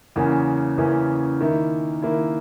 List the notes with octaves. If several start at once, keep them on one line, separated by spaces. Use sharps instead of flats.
E2 C#3 E3 A#3 C#4
E2 C#3 E3 A#3 C#4
D#3 A#3 E4
D#3 A#3 E4